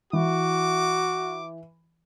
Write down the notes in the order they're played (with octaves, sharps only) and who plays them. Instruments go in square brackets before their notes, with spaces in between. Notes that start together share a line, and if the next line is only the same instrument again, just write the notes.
[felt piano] E3 [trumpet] F#4 [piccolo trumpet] D6